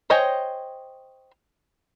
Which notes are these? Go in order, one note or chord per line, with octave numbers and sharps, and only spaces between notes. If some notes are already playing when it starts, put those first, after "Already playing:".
C5 C#5 D#5 G5 G#5